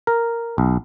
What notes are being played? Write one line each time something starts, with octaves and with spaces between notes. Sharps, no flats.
A#4
B1